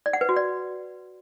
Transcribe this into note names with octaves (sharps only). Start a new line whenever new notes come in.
D5
F#5
B4
F#4
D5